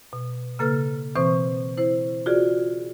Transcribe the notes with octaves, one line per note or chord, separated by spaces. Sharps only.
B2
C#3 A#3 A4 B4 F6
B2 E3 C4 C5 C#6
E4 C5
F4 F#4 G#4 D5